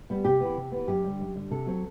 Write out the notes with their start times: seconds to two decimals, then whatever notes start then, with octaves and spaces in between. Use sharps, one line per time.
0.10 G3 B3
0.25 C3 G4
0.40 E3 B3
0.56 C3
0.72 E3 B3
0.87 F#2 G4
1.04 D3 G3
1.20 F#2
1.35 D3 G3
1.51 C3 A4
1.66 F#3 C4